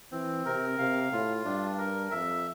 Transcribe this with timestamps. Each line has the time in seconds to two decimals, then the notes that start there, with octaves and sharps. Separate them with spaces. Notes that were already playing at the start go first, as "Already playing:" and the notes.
0.12 E3 C4
0.45 C3 A#4
0.78 C3 F5
1.12 A2 F4
1.45 G2 D4
1.78 A#4
2.11 F2 E5